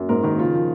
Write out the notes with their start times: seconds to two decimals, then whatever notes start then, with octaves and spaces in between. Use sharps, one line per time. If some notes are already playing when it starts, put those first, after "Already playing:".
Already playing: F#2
0.09 G#2 A#4
0.23 D#3 A#4
0.38 C#3 F4
0.54 F3